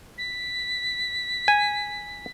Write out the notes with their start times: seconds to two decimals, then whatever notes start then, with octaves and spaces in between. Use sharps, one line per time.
0.18 B6
1.48 G#5